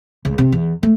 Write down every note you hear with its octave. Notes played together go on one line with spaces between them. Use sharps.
C#2
C3
E2
A3